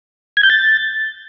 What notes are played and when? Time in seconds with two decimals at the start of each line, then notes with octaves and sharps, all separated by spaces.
0.37 G#6
0.43 G6
0.50 A6